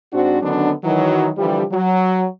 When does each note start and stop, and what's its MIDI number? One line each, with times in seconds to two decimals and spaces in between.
0.13 0.40 44
0.13 0.40 60
0.13 0.40 62
0.13 0.40 66
0.42 0.72 50
0.42 0.72 51
0.42 0.72 54
0.42 0.72 59
0.42 0.72 61
0.42 0.72 62
0.84 1.28 51
0.84 1.28 52
0.84 1.28 54
1.38 1.64 50
1.38 1.64 52
1.38 1.64 53
1.38 1.64 55
1.72 2.24 54